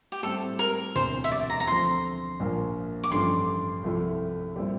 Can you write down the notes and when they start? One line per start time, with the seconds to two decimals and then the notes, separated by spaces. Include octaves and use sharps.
0.12 G4
0.23 A2 G3 C4 A4
0.59 A#4
0.95 E1 D2 C3 E3 C5
1.24 E5
1.32 D5
1.50 A#5
1.60 A#5
1.67 D2 D3 F3 C4 C6
2.40 A#1 A#2 F3 A#3
3.04 D6
3.11 A1 G2 D3 F3 A3 C6
3.83 C2 C3 F3 A3 E4
4.56 A#2 G3 C4 E4